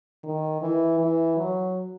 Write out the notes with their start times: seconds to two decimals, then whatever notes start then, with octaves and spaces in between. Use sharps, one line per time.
0.23 D#3
0.61 E3
0.99 E3
1.37 F#3